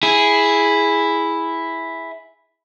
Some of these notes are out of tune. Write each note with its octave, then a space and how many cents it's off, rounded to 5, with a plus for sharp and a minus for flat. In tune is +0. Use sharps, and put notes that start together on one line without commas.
E4 +0 G#4 +0